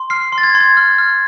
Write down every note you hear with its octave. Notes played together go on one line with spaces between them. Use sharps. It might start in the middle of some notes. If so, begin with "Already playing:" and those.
Already playing: C6
F6 C7
C6
A6
G#6
C6
G#6
F6
F6